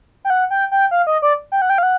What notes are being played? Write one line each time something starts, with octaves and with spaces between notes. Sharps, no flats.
G5
F#5
G5
G5
F5
D#5
D5
G5
F#5
G5
F5
F#5